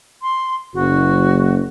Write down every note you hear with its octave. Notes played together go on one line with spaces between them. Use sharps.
C6
F#1 F#4